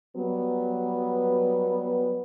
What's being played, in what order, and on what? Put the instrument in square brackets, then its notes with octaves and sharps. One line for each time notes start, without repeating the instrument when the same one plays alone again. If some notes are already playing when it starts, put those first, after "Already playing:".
[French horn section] F#3 G3 B3